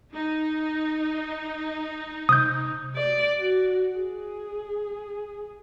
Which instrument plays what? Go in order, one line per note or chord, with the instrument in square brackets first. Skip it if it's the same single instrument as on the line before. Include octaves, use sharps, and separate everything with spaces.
[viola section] D#4
[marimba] C3 [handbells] D#6 G6
[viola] D5
F#4
G#4